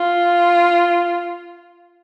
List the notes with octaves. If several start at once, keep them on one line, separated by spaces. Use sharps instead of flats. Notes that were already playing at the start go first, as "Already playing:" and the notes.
Already playing: F4